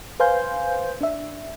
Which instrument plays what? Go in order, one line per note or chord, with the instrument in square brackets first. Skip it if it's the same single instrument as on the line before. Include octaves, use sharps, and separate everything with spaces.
[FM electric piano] B4 C5 F5 G#5 C6 G6
D4 E5